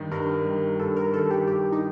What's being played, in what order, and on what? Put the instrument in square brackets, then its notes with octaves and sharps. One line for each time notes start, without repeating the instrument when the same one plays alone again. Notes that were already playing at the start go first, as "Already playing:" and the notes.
Already playing: [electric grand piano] G2 D#3 G3
[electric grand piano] G2 [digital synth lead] A#4
[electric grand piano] D#3 G3
[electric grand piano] G2 [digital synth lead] A4
[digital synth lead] A#4
[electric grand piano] D#3 G3 [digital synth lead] A4
[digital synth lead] G4
[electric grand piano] G2 [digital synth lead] G4
[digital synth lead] D#4